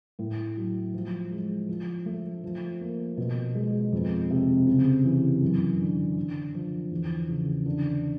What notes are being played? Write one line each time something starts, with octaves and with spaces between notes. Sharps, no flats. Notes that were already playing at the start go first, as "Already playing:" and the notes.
A2
F#3
F3
G#3
F3
A3
F3
A#3
B2
G#3
F2
C3
C#3
E3
F#2
D3
D3
F3
E2
C#3
D3